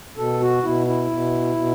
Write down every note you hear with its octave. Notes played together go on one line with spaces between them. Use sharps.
B2 A4
F#4
B2 E4
E4
B2
B2